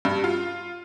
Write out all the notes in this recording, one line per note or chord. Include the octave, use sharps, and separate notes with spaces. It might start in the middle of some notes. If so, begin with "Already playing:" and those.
G2
F4